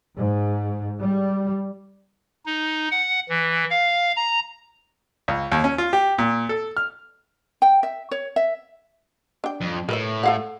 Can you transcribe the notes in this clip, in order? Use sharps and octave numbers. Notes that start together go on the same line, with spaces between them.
G#2
G3
D#4
F#5
E3
F5
A#5
C#2
D#2
C#4
F4
G4
A#2
A4
F6
G5
E5
C#5
E5
D4 G5
F2
A2 A#4 B4 E5
A4 F5 F#5